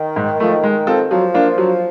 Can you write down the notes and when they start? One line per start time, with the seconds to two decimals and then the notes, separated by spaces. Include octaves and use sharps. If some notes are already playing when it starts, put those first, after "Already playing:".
Already playing: D#3
0.16 G#2
0.40 F3 A3
0.63 G#3
0.87 C4 F4 A4
1.10 F3 F#3
1.34 A#3 D4 F4
1.58 F#3